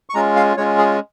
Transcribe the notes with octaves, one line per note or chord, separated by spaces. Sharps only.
C#6
G#3 C#4 F4 A#5
F5
G#3 C#4 F4 C#5
G#4